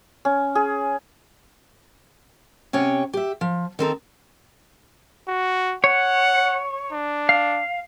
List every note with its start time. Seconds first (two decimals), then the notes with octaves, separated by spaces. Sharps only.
0.25 C#4
0.55 G#4
2.73 C3 C#4 C#5 G5
3.13 G4 E5
3.41 F3
3.79 D#3 C4 A4 A#5
5.28 F#4
5.84 C#5 F#5
6.93 D4
7.29 F5